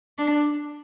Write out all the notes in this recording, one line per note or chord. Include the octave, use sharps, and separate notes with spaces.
D4